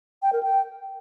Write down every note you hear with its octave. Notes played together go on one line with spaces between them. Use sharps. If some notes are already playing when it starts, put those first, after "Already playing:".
G5
A#4
G5